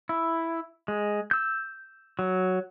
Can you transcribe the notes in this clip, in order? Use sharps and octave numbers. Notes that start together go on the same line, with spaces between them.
E4
G#3
E6 G6
F#3